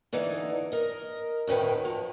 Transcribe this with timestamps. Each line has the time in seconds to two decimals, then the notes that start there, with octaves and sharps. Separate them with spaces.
0.13 D3 E3 D#4
0.72 A#4 D#5
1.47 D2 A2 D#3 B4 G5
1.85 F3